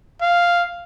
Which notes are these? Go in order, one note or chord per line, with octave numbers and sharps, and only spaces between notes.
F5